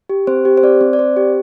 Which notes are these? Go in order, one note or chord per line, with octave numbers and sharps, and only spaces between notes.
G4
C4 C5
G4
C5
C4 D5
C4
D5
C4 C5
G4